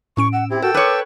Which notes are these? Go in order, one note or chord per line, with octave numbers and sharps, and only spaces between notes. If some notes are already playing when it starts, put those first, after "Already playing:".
A2 C#4 C#6 D7
F#5 E6
C4 E4 G4
F#4 A4 A#4 G5 E6
B4 C#5 D6